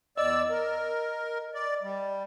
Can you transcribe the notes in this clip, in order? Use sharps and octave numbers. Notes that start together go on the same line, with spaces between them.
E2 D5 D#5 E6
A#4
D5
G3